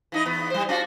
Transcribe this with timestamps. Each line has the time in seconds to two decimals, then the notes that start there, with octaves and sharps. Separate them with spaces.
0.12 E3 D#4 D#5
0.25 E2 B3
0.50 G3 C5
0.69 C#4 F4 F#4